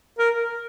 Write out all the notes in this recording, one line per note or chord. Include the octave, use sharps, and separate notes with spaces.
A#4